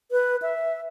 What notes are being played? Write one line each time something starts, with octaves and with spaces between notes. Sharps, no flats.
B4
E5